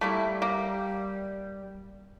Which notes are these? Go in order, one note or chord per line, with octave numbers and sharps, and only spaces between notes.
G3 A3 A#3 E4
A#3